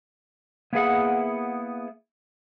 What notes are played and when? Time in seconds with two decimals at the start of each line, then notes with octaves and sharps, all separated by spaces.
0.73 A#3 B3 E4 G#4 E5 F#5